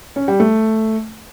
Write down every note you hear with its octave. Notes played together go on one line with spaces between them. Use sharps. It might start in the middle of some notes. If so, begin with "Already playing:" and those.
C#4
G3
A3